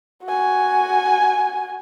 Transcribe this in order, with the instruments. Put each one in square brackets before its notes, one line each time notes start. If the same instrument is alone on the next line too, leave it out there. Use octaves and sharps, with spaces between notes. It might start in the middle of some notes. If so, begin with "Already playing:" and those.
[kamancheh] F#4 G#5